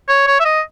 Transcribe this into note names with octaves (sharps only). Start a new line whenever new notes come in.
C#5
C#5
E5
D#5